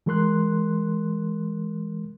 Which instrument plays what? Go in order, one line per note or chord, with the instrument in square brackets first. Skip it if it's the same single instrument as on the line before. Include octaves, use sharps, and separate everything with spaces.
[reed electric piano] E3 G#3 A#4 C6 F#6